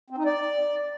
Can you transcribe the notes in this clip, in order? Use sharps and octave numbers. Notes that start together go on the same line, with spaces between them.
C4
D#4
D5